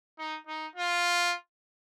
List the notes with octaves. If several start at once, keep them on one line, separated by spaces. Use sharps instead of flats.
D#4
D#4
F4